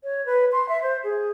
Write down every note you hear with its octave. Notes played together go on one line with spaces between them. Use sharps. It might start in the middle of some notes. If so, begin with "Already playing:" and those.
C#5
B4
C6
E5
C5
G#4